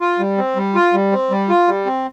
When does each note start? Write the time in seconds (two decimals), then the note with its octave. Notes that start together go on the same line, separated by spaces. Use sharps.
0.01 F4
0.19 G3
0.38 C4
0.56 G3
0.75 F4
0.93 G3
1.12 C4
1.30 G3
1.49 F4
1.68 G3
1.86 C4